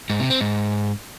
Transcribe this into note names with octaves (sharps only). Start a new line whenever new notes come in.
G#2
C3
C4
G#2